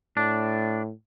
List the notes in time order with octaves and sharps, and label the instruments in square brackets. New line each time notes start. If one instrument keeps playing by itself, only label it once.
[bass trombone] A2 [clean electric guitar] D4